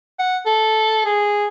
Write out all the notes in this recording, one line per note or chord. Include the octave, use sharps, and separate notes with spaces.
F#5
A4
G#4